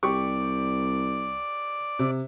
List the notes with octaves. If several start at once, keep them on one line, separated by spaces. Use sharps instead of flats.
C2 G4 D5 C#6
C3